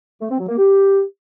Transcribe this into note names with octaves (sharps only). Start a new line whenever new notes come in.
A3
C4
F#3
A#3
G4